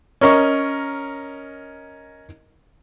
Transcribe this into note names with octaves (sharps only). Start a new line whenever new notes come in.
C#4 A#4 D#5 C#6